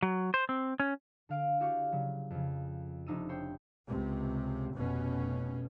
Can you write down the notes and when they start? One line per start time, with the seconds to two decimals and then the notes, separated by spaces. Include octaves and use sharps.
0.03 F#3
0.34 C5
0.49 C4
0.80 C#4
1.29 D3 F5 D7
1.60 E4 F#4 G4 D5 F5 C#6
1.92 C#3 F#3
2.30 F2 C#3
3.07 F1 D4 D#4 D#5 E6 D#7
3.29 C5 C#5 G5 C6
3.87 C#2 C3
4.74 F1 B2 C#4